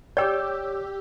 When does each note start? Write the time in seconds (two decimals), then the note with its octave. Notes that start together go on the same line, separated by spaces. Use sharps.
0.17 G4 C#5 D5 G5 D6 E6 G6